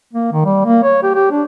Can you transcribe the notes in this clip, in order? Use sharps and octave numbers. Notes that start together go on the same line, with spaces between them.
A#3
D#3
G3
A#3
C#5
G4
G4
D4